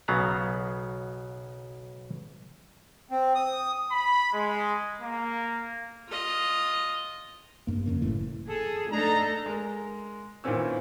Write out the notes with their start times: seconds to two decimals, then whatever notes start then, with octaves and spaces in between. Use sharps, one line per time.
0.08 B1 C#3 F#3 B3 F5 A#5
3.11 C4
3.35 D#6
3.91 B5
4.33 G#3
5.00 A#3
6.08 F4 D#5
7.67 G2 A#3
7.86 F2 C#3 A#3
8.02 F#1 A2 E3
8.49 G#4 A4
8.92 A3 D4 D#4 A4 A#5
9.46 G#3 A#4
10.44 A#2 D#3 E3 C4 C#4 E6